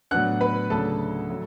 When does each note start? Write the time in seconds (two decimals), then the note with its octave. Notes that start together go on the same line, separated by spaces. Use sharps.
0.11 A2 F#3 B3 D4 F#5 F#6
0.41 B4 B5
0.70 D2 C#3 F#3 A3 D4 A4 A5
1.30 A2 F#3 A3